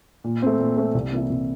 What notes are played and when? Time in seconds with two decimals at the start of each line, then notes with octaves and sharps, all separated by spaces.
0.24 A#2
0.42 A3 C4
0.59 A#2
0.77 A3 C4
0.94 C2
1.12 C3 E3 A#3 E4
1.30 C2